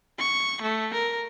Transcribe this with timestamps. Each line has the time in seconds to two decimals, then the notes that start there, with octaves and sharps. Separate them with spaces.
0.19 C#6
0.62 A3
0.94 A#4